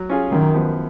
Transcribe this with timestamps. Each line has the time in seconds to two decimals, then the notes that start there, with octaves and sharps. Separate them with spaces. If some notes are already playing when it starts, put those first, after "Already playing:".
Already playing: F#3
0.09 C#4 F4 G#4
0.32 F#2 D#3
0.54 F3 B3